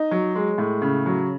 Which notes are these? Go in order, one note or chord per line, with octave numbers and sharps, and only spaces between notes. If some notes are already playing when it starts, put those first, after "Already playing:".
Already playing: D#4
F#3
G#3
A2
C#3
F#3